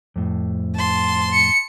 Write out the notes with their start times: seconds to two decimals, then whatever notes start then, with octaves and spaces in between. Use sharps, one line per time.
0.16 F2 A2
0.76 A5 C6
1.32 C#7